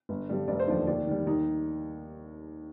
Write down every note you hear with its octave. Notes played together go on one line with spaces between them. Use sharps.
G1
G2 D3 G3
F1 D5
C5
D#2 D3 F3 D5
D#2 D5
D#3 G3
D#2 D#4